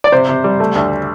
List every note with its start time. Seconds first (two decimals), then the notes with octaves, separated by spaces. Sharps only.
0.04 D5
0.12 C3 C5
0.29 C3
0.44 G3
0.60 A3
0.75 D2